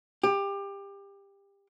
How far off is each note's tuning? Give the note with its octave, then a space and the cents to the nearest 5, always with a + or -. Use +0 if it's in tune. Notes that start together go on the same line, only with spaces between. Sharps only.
G4 +20